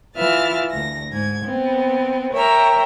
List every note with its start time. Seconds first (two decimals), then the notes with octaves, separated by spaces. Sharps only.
0.16 E3 F4 B4 E5 F6 A6
0.71 D2 A#6
1.11 G#2 G#6
1.44 B3 C4
2.33 A#4 C#5 E5 G5 A#5